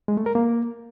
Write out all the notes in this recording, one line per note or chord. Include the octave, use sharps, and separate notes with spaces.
G#3
A3
A#4
A#3